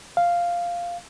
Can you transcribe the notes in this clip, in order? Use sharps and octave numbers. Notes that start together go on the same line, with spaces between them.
F5